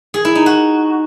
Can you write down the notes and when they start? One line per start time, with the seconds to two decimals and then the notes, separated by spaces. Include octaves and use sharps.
0.14 G#4
0.25 E4
0.35 D#4
0.46 F#4